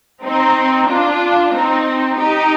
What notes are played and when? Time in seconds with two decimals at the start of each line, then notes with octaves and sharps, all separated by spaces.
0.24 C4 D#4
0.89 D4 F4
1.54 C4 D#4
2.19 D#4 G4